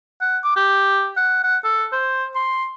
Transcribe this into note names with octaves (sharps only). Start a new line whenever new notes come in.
F#5
D6
G4
F#5
F#5
A4
C5
C6